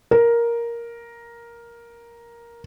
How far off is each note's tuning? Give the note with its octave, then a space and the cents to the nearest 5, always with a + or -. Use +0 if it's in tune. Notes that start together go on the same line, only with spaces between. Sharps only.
A#4 +5